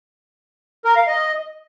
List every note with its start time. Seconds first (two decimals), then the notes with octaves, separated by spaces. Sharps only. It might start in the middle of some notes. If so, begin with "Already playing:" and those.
0.85 A#4
0.96 F5
1.07 D#5